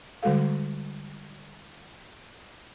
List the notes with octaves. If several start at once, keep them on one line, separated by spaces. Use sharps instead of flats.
D3 G3 G#3 F#4 A4 F5